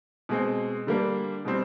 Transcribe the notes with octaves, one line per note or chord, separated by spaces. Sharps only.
B2 G#3 C4
D3 G3 A#3 D4
B2 G3 C4